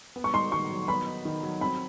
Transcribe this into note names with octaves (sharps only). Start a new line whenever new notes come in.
B3
C#6
D#4 C6
D#3 C#6
F#3
B3 B5
D#4
D#3
F#3
C4 B5